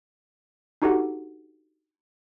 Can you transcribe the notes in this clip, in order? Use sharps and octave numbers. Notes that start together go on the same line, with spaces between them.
D4 D#4 F#4 G4 A4 F#5